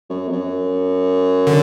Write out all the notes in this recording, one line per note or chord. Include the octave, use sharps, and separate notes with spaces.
F#2
F2
F#2
D3